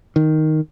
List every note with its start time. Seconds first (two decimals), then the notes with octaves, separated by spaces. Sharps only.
0.16 D#3